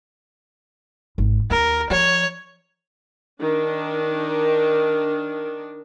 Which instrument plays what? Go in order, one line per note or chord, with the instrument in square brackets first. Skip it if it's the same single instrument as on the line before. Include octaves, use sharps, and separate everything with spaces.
[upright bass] G#1
[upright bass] D#2 [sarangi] A#4
[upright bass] F3 [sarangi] C#5
[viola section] D#3 D4